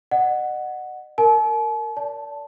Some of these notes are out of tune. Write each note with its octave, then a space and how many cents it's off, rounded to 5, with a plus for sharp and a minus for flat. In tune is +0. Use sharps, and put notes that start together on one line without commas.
D#5 -35 F#5 +0
A#4 -15 A5 -45
D5 -30 A5 +0